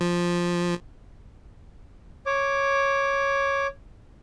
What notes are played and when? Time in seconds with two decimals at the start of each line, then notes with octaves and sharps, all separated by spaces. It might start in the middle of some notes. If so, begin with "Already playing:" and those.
0.01 F3
2.26 C#5 D6